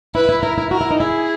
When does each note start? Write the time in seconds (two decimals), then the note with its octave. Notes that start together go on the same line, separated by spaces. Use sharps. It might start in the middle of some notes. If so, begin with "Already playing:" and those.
0.15 E4 B4
0.29 E4
0.43 E4 A#4
0.58 E4
0.71 F#4 A#4
0.81 E4
0.91 D#4
1.00 E4 G#4